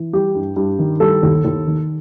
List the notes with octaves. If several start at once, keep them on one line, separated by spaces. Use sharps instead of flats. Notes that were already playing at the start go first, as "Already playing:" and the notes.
Already playing: E3
G3 G4
G2
G2
D#3
G3 A4
D#2
D#2
D#3